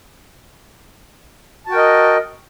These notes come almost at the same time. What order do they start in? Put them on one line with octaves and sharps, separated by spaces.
A5 F#4 G5 A#4 D#5